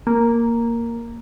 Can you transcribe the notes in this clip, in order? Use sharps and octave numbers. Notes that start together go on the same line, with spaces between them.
A#3